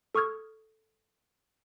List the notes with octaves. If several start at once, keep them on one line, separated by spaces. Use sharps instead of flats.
A4 C#6 D#6 F6 G#6